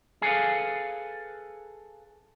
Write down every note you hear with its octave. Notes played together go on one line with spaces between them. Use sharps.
G#4 A4 B4 F5